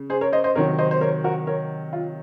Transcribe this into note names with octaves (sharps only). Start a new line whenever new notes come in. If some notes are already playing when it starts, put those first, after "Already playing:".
Already playing: C#3
G#4 C5
A#4 C#5
C5 D#5
C5 D#5
C3 D#3 F#3 A#4 C#5
C5 D#5
C5
A#4 C#5
F#4 A#4
A#4 C#5
F4